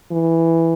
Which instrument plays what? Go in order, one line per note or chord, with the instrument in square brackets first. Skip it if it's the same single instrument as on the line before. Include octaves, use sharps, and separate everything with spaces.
[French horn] E3